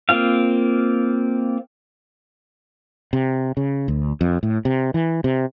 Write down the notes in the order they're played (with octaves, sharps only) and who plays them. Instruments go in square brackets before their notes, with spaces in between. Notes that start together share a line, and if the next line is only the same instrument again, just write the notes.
[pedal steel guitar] A#3 C4 F4 F5
[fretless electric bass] C3
C#3
D2
F2
A2
C3
E3
C3